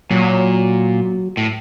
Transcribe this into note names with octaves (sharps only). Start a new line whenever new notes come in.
A#2 F#3
A2